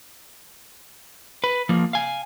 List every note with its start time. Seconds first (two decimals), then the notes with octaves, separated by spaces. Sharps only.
1.44 B4
1.69 F3 A#3
1.93 F5 G#5